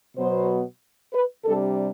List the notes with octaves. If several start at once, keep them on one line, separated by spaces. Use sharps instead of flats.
B2 F#3 B3 C5
B4
C3 G3 D4 A4